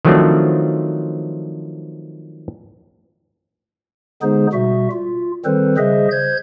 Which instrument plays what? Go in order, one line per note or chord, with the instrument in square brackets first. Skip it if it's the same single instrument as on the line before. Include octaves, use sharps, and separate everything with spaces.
[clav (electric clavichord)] D#3 F3 F#3 A3 C4 D4
[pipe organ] D3 G#3 B3 D#4 G#4 C5
B2 G3 F#4 E5
F4
D#3 G3 C4 A4 B4 C5
C#3 G3 G#4 C5 D#5 E5
C5 G6 G#6